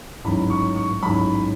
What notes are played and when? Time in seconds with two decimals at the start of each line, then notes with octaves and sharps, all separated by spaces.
0.24 A1 G#2 F#3 B5
0.50 C#6
0.76 C#6
1.03 A1 G#2 F#3 B5